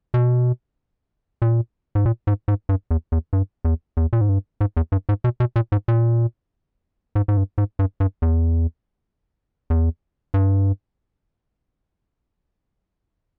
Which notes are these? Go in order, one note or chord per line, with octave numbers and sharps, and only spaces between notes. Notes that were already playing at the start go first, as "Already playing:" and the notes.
B2
A#2
G#2
A#2
G#2
G#2
G2
E2
E2
G2
E2
E2
A#2
G#2
G2
G#2
E2
G2
G#2
B2
B2
A#2
G#2
A#2
G#2
G#2
G2
G#2
G2
G2
E2
E2
G2